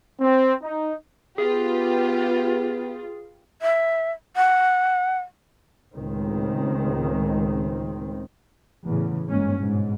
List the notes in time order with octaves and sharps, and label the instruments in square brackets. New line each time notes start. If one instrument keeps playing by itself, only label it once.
[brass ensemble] C4
D#4
[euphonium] B3 [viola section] F4 [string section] G4 B4 [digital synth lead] G#4
[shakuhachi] E5
F#5
[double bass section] C#2 A2 D#3 C4
E2 A2 C#3
G1 G#2 A#3 C#4
G#2 B2